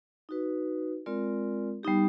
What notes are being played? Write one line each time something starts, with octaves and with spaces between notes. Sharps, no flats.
D#4 F#4 B4
G#3 C4 F4 A#4 D5
G3 B3 D#4 G4